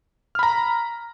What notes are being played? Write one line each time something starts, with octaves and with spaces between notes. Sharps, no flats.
A#5 B5 F6